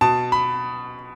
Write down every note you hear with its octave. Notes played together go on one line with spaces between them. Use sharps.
B2 A5
B5